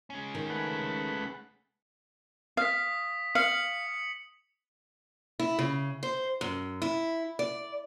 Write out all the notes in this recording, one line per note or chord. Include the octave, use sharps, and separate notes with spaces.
G#3 C#4
D#3
A3 B4 F#5
F5 D#6 B6
F5 C#7 F#7
E4
C#3
C5
F#2
E4
D5